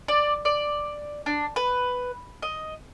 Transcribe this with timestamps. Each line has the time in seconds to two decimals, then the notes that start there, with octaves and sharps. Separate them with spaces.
0.08 D5
0.45 D5
1.26 D4
1.56 B4
2.42 D#5